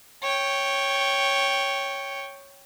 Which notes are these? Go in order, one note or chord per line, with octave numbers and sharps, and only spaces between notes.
C#5 G5